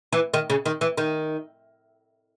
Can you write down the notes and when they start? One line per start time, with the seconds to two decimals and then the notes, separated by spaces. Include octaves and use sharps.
0.12 E3
0.34 D#3
0.50 C#3
0.66 D#3
0.81 E3
0.97 D#3